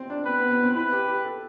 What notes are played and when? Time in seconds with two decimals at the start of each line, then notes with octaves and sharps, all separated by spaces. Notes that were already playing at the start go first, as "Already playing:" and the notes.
Already playing: C4
0.10 D4
0.26 C4 B4
0.39 B3
0.51 B3
0.63 C4
0.75 E4 B4
0.92 G4
1.08 G4
1.24 A4